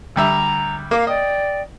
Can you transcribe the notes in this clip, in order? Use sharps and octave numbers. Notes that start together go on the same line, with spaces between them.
D2 G3 E5 A#5
A#3 F5 D6
D5 D#5 G5